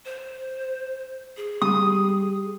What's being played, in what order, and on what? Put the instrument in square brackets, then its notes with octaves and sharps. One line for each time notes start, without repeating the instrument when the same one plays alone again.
[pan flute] C5
G#4
[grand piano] G3 [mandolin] D#6